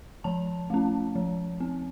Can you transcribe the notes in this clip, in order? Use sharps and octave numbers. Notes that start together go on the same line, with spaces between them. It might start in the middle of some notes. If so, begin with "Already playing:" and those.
F3 A5
A3 C#4
F3
C4